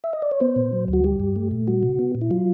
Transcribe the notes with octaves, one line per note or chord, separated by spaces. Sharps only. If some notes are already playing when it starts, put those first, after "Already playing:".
E5
D#5
D5
C#5
B3 C5
A#2
F#3
D2
F#4
G3 G4
G2
A3
A#2
G3 F#4
C3
B3
A#2
E4
F#3 F4